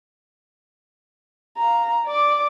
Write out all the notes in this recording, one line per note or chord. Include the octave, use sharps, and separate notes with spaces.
F5 A#5
D5 D6